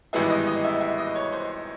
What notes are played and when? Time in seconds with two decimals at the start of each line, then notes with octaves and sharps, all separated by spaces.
0.13 G#1 G2 E3 G#3 B3 E5
0.30 D#5
0.47 D#5
0.65 E5
0.81 E5
0.98 D#5
1.16 C#5
1.32 C5